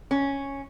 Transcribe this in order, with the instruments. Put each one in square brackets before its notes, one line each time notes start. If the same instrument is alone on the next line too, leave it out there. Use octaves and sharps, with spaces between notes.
[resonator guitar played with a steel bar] C#4